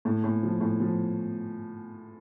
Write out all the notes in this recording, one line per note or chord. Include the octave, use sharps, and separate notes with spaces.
A2
A2
F3
A2
F3